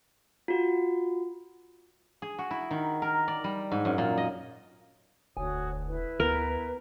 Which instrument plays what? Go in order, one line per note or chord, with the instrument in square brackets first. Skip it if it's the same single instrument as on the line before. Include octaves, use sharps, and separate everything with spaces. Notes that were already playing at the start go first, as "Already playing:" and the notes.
[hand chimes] F4 F#4
[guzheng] G#4
F#4
E4
D#3
A#4
D5
G3
G#2
F#2
A#2
D#5
[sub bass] E1 [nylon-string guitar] D2 G#5 [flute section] F#4 C#5 D#6
[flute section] E4 B4
[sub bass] D2 [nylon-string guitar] B3 [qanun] A#4